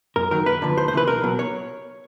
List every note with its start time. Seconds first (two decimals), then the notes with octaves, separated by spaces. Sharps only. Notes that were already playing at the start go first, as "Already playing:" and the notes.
0.16 F#2 A#4
0.31 D#3 F#3 A#4
0.46 F#2 B4
0.62 D3 F3
0.77 D2 C5
0.88 C5
0.93 C#3 E3 B4
1.07 B1 A#4
1.23 B2 F#3
1.39 C#5